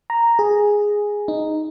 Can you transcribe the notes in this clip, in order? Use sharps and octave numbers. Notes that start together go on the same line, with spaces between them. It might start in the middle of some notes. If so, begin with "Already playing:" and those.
A#5
G#4
D#4